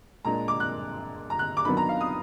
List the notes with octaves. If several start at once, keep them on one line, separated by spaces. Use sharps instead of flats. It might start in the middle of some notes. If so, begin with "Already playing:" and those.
A#2 G#3 D4 A#5
D6
F#6
A#5
F#6
D6
D#3 F#3 B3 D4 B5
A#5
F5
D#6